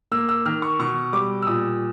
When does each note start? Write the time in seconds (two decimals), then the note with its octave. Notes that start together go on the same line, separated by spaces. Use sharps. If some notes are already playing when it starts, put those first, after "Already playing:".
0.11 A#3 E6
0.29 E6
0.46 D#3 F6
0.62 C#6
0.79 B2 C#6
1.13 G3 D6
1.42 E6
1.47 A#2 D#6